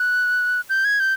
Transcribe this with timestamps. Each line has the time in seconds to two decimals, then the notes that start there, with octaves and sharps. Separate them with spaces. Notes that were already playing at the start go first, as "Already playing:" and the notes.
Already playing: F#6
0.70 G6
0.85 G#6
1.00 G6